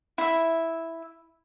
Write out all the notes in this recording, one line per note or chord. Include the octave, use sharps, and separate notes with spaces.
E4 E5